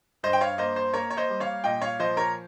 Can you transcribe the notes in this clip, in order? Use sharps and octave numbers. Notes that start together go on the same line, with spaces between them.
G2 C5 D#5
G5
C#5 F5
A#3 C5 D#5
C5
A#3 A#4 C#5
C#5
C5 D#5
G3
C#5 F5
A#2 D#5 G5
C#5 F5
F3 C5 D#5
A#4 C#5